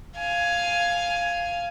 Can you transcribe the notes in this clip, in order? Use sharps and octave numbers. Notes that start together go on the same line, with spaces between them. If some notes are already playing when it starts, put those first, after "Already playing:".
F5 G#5